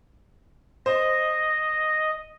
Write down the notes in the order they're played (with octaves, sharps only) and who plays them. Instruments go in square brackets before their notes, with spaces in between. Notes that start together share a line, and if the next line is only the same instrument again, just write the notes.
[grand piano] C5 [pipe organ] D#5